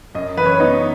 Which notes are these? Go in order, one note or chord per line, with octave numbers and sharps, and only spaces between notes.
F#2 D#5
E3 B4
C#5
B4
B3 D#4